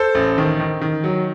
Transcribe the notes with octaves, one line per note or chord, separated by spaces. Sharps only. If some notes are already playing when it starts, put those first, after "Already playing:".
Already playing: A4 C5
A1
D#3
D#3
D#3
F#3